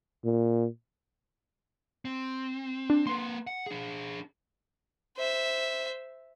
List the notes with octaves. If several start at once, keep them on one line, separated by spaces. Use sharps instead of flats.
A#2
C4
D4
A#3 B4 C6
F#5
D4 G#4
C5 E5